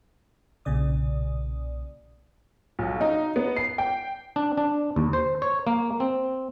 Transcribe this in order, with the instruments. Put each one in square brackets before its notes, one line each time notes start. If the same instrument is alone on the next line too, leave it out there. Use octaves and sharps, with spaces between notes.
[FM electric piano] B1 A#2 C#3 D5 D#6
[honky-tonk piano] B1
D#4
B3
C7
G5
[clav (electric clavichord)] D4
D4
D#2
C5
C#5
A#3
C4